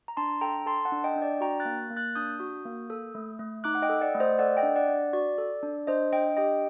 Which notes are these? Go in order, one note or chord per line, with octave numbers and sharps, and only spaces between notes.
A#5
D4 A5 C6
A4 G5 A#5
A4 A5 C6
F#5 A5
D4
D#5 G5
D4
D5
F#4 G5 A#5
F#6 A6
A#3
A#3
F#6 A6
D4 D#6 G6
F#4
A#3
A4
A3
A3
D#4 D6 F#6
F#5
D#5 G5
A4
D5 F#5
A3
C5 D#5
A4 D5 F#5
D#5 G5
D4
D5 F#5
D4
F#4 D5
A4
D4
D4 C5 D#5
D4 D#5 G5
G4 D#5 G5